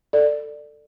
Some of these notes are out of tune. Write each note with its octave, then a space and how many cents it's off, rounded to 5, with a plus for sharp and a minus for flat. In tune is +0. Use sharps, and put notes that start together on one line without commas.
A4 +20 D5 +15